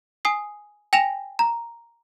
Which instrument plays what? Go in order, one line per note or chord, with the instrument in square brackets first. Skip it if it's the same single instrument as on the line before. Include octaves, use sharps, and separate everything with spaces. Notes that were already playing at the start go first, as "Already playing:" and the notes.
[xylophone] G#5 D#6 C7
G5 G#5 A#6 E7 F7
A#5